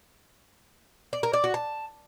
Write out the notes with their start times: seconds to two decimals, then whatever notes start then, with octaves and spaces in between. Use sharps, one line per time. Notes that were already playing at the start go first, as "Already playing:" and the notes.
1.13 D5
1.23 A#4
1.33 D5
1.44 F#4
1.54 A5